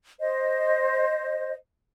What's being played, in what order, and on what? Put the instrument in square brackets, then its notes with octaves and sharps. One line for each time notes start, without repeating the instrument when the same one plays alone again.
[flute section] C5 D#5